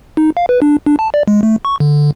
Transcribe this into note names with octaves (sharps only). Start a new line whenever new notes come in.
D#4
F5
B4
D4
D4
A5
D5
G#3
A3
C#6
D3